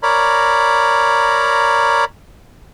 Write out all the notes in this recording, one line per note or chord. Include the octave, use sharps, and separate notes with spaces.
A#4 C#5 D5 A#5 B5